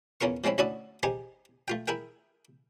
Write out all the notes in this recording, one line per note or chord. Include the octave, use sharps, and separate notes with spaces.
E2 C#4 F4 A#4 C#6
F3 G#3 C4 C#4 E4
D2 C#4 E4 F#4 D5 D#6
D#4 G4 G#4 C5 G#5
A3 F4 G5
E4 G#4 A#4 G5